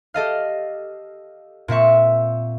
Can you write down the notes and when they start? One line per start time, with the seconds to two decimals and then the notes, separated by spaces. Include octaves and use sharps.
0.14 G4 A4 D#5 F5
1.68 A#2 C4 E5 C#6